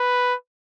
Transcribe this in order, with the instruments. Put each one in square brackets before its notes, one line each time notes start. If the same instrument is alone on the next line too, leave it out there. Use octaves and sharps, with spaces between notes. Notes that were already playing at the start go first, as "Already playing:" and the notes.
Already playing: [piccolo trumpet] B4